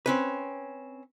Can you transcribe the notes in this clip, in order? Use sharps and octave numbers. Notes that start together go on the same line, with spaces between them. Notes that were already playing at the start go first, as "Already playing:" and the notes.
C4 C#4 B4